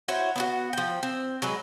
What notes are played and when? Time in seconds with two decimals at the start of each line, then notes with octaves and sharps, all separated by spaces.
0.08 E4 F#4 C5 C#5
0.36 B3 E4 F#4
0.73 F3 G5
1.03 C4
1.42 F#3 G#3 B4